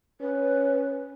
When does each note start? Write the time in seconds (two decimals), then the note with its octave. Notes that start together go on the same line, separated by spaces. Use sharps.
0.21 C#4 B4